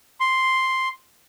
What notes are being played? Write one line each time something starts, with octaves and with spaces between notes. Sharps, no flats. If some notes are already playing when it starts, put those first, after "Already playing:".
C6